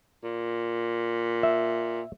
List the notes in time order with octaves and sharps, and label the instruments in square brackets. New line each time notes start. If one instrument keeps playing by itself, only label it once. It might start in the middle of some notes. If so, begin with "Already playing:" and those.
[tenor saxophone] A#2
[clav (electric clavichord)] E5